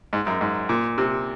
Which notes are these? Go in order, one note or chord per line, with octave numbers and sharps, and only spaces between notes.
G#2
F#2
G#2
A#2
C3